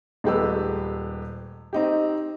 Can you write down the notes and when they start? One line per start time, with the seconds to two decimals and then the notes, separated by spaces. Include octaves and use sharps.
0.24 D#1 G#3 A3 G4 B4 E6
1.73 C4 D#4 G4